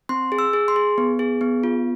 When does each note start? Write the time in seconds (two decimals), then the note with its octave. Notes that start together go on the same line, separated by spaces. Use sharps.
0.09 C4 C6
0.32 G#4
0.39 E6
0.53 G#4
0.68 C6
0.76 G#4
0.98 B3
1.19 G#4
1.41 B3
1.64 F4